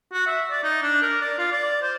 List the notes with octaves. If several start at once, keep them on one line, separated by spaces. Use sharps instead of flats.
F#4
E5
D5
D#4
D4
A#4
D5
F4
D5
C5